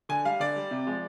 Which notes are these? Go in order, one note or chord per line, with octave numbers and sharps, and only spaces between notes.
D3 G#5
G3 F5
D3 D5
G3
C3
F3 G#3